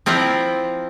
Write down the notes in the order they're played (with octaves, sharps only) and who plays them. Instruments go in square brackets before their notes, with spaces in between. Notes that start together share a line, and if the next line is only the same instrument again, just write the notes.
[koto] F3 C4 E4 F4 A#5